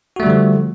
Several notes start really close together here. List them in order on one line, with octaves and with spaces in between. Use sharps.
F#4 A3 G3 D3 F3